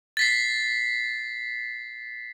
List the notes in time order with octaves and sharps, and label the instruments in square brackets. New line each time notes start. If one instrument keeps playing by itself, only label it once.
[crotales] A6 B6 C7